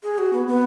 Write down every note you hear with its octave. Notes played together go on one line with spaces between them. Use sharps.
G#4
F#4
B3
B3